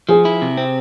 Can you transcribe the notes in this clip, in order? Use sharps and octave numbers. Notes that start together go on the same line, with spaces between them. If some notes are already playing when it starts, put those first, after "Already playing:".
F3 G#4
E4
C3
C4